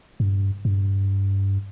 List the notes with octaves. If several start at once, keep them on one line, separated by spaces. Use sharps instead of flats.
G2
G2